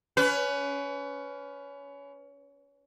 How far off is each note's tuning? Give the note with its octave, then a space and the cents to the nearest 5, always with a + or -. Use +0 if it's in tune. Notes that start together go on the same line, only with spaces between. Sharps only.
C#4 +25 B4 +20